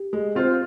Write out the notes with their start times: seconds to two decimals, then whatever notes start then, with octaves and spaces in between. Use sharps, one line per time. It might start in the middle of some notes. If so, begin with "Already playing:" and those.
Already playing: G4
0.13 G#3
0.35 C4 F4 C5